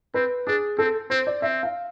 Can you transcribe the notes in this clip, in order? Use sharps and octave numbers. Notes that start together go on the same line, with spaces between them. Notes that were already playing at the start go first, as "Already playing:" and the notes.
C4 B4
D4 G#4
C4 A4
C4 C5
D5
C4 E5
F5